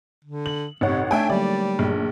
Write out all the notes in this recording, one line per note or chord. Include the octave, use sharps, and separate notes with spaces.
D3
F#7
A1 C3 D#4 C#5 F#5
A3 D4 C#5 E5 G5 G#5
D3 F#3 G3 A#3 D5
A#1